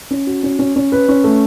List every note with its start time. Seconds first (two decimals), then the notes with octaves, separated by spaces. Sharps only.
0.11 C#4
0.27 F#4
0.43 C#4
0.59 C#4
0.76 C#4
0.92 B4
1.08 C#4
1.24 A3